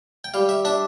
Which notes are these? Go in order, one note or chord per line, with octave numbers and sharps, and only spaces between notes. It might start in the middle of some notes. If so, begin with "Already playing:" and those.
G5
G3 F5
E5
D4 E5